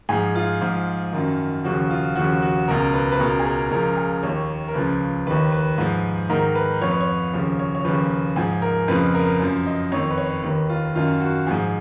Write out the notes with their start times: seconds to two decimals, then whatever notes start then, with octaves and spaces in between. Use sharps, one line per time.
0.09 G#2 F3 G#4
0.35 F4
0.61 G#2 F3
1.13 F#2 D#3
1.64 D#2 C#3 F3 F#4
1.91 F4
2.16 D#2 C#3 F3 F#4
2.42 F#4
2.68 C#2 B2 A#4
2.94 B4
3.12 B4
3.20 C#2 B2 A#4
3.39 G#4
3.45 A#4
3.71 C#2 C#3 F3 A#4
3.97 G#4
4.23 D#2 D#3 C#5
4.68 A#4
4.74 C#2 C#3 F3 B4
5.27 D#2 D#3 B4
5.52 B4
5.78 G#2 F3
6.30 G#2 D#3 A#4
6.55 B4
6.81 F2 F3 C#5
6.91 B4
7.01 C#5
7.33 D#2 C#3 F3
7.59 C#5
7.75 C#5
7.85 D#2 C#3 F3 B4
8.36 G#2 F3 G#4
8.62 A#4
8.88 F2 C#3 F3 B4
9.14 A#4
9.40 F#2 F3
9.66 D#5
9.92 F2 D#3 C#5
10.11 B4
10.18 C#5
10.43 D#2 D#3 B4
10.70 F4
10.95 F#2 D#3 F4
11.21 F#4
11.46 G#2 F3 G#4